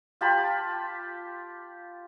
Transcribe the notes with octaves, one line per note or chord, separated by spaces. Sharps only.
F4 G4 A5 B5